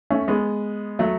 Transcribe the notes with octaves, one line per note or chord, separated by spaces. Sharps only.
A3 C#4
G#3 B3
F#3 A3